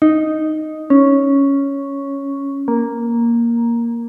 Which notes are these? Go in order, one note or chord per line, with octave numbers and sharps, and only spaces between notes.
D#4
C#4
A#3